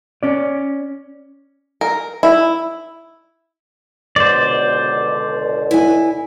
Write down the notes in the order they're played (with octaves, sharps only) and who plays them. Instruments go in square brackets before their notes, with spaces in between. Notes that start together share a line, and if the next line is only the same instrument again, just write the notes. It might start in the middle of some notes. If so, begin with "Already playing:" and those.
[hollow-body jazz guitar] C#4 D5
[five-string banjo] A#4
E4
[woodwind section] C#2 B2 D3 [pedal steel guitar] C5 D5
[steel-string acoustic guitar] E4 G#5